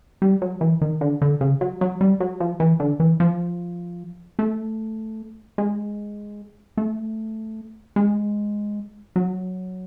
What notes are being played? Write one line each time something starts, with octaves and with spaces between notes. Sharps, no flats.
G3
F#3
E3
D#3
D3
D3
C#3
F#3
F#3
G3
F#3
F3
E3
D3
E3
F3
A3
G#3
A3
G#3
F#3